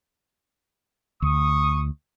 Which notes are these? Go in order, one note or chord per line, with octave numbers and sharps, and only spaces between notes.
D2 C#6 D#6